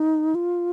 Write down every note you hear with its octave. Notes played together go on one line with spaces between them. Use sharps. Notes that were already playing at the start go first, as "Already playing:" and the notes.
Already playing: D#4
F4